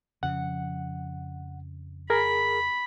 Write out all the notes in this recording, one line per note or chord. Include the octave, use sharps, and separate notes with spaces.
F2 C#3 F3 F#5
G#4 A#4 B5